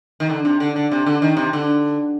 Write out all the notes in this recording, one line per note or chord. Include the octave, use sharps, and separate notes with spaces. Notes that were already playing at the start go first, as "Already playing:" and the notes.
D#3
D3
C3
D3
D3
C3
D3
D#3
C3
D3